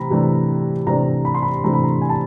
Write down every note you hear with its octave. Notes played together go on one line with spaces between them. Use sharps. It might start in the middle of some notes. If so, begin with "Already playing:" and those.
Already playing: C3 E3 A3 A#5 B5
C3 E3 A3 D4
C3 E3 A3 D4 A#5
B5
C6
B5
C3 E3 A3 D4 A#5
B5
A#5
G#5
A5